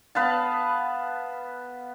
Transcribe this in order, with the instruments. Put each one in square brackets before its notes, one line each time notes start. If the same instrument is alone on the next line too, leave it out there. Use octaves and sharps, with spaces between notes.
[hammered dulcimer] B3 B4 F5 A5